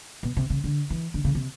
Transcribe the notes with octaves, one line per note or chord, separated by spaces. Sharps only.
B2
C3
C#3
D3
E3
D3
C#3
C3